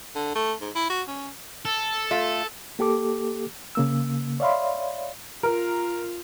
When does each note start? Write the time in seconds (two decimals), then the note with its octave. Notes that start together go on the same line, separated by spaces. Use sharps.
0.15 D3
0.35 A3
0.61 G#2
0.75 E4
0.90 F#4
1.08 C#4
1.65 A4
2.11 A3 F4
2.79 A#3 G4 A4 D6
3.75 C#3 A#3 E6
4.40 C#5 D5 E5 F5 B5 C6
5.43 F4 A#4